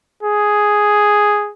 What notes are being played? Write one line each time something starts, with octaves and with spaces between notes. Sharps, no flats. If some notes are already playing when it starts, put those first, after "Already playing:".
G#4